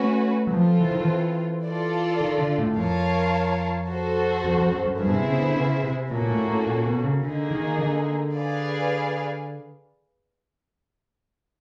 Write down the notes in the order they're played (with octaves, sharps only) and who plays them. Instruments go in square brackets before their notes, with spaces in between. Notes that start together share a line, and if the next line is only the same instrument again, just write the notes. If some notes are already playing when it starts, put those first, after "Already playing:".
Already playing: [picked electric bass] A3 [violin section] C#4 F#4 B4
[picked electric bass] F#3
[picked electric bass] F3 [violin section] C4 F4 A4
[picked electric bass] E3
D#3
E3
[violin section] F4 A4 D5
[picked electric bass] D#3
D3
A2
[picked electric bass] F2 [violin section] F4 A#4 C#5 F5 A5
[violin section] F#4 A4 C5
[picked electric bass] F2
F2
F#2
F#2
[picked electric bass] G2 [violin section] B3 E4 G#4 C5 E5
[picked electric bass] B2
C3
C#3
D3
C#3
C3
[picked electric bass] A#2 [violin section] A#3 C#4 F#4 A4
[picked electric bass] A#2
A2
A2
A#2
B2
C#3
[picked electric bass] D3 [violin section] A#3 D#4 G#4
[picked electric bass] D#3
D3
[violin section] G#4 B4 D5 F5